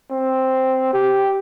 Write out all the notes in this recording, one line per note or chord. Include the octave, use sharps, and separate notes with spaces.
C4
G4